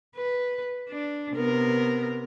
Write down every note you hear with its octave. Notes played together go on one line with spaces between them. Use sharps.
B4
D4
C3 B3 A#4